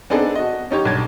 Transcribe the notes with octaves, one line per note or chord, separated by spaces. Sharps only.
B3 C4 D4 D#4 G#4 A4
F#4 D#5
C#4 D#4 G4 C#5
B1 G2 G#6